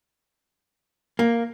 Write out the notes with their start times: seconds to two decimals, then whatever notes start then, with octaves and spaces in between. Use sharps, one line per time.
1.19 A#3